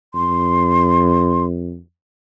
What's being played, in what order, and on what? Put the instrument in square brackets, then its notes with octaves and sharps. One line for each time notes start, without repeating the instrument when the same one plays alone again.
[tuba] F2 [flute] C6